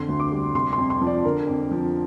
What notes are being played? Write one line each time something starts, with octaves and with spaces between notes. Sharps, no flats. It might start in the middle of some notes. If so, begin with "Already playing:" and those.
Already playing: F2 D3 C6
D2
D6
G3
C3 C6
C6
F2
C6
F3
D5
D3 A#4
F2
F3